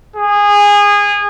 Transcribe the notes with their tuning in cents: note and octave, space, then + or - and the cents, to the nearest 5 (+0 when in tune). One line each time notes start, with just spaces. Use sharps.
G#4 -20